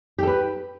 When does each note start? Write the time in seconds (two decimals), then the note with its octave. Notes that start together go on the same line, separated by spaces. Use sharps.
0.18 G4
0.23 A4
0.27 B4